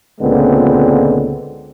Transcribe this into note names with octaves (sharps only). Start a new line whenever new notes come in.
C#2 A#2 D3 G#3 B3 C4